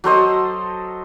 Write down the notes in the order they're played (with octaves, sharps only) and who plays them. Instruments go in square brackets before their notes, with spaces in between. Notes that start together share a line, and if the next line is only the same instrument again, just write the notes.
[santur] F#3 A4 C5 D#5